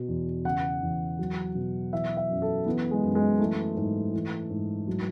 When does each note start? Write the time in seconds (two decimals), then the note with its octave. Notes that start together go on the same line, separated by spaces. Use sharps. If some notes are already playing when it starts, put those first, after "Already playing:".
Already playing: B2
0.08 E2
0.45 C#3 F#5
0.82 E2
1.19 F#3
1.55 B2
1.93 E3 E5
2.17 E5
2.30 F#2
2.42 A4
2.66 E3 B3
2.91 G#3
3.03 F#2
3.15 G#3
3.40 E3 A3
3.77 G#2
4.14 E3
4.50 G#2
4.88 F#3